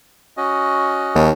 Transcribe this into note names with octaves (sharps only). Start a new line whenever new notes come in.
C#4 F#4 D#5
D#2